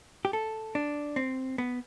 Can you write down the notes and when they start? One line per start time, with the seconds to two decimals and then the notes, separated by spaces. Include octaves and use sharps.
0.25 G4
0.33 A4
0.75 D4
1.16 C4
1.58 B3